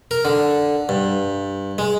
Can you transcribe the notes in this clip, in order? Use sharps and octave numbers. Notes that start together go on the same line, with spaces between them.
A#4
D3
G2
G#3